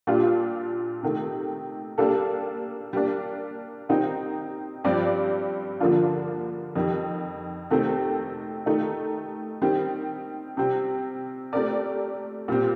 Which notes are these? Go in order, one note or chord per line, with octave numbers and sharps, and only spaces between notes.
A#2 G3 D4 F4
C3 D#3 A3
G3 A#3 D4 A4
G3 A#3 D4
D#3 G3 C4 D#4
G2 F3 C4 G4 D5
D3 F3 A#3 D4 F4
F2 D#3 G3
C3 D#3 A3 C4
D#3 A3 D#4
D#3 G3 C4
C3 G3 C4
A3 C4 G4 A#4 D5
A#2 G3 C4